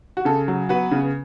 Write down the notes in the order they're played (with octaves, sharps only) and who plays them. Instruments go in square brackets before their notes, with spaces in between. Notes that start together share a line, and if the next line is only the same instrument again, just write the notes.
[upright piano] F#4
C#3 A4
F#3
B3 F#4 B4
C#3